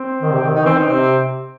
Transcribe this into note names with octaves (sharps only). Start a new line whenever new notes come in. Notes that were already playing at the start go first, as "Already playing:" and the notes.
Already playing: C4
D#3
C3
D#3
D#3 D#4
E3
C4
D#4
C3 C4